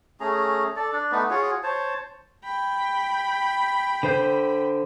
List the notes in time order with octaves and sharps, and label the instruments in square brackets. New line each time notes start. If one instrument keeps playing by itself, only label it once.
[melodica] A3 C#4 G#4 A#5
A4 D5
D4 D5
A3 B3 D#4 B4
F4 F#4 G#4 C#5
C5 C#5 A5
[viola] G5 B5
[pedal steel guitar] D3 C5 G6